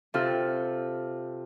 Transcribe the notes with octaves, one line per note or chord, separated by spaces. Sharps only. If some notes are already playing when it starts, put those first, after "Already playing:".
C3 F4 A4